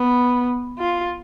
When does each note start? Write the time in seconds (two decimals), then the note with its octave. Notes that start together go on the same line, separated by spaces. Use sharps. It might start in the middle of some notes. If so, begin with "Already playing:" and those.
Already playing: B3
0.79 F4